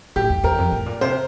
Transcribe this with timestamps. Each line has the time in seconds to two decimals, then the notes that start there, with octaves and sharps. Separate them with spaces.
0.16 A2 G4
0.30 E2
0.44 E2 A#4
0.58 F2
0.72 A2
0.86 A#2
1.01 C3 C5